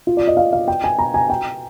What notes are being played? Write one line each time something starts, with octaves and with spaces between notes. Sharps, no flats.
F4
D5
D#5
F5
F5
G5
G#5
A#5
G#5
G5